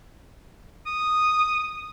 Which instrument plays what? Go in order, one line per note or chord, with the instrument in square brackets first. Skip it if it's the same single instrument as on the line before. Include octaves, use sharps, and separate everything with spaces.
[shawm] D#6